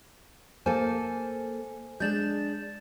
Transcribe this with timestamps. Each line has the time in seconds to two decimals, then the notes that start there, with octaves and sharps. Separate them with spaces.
0.66 A#3 A4 C5 G#5
2.00 G#3 D4 G6 A6 E7